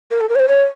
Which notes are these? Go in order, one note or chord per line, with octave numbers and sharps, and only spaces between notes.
A#4
A4
A#4
C#5
C5
C#5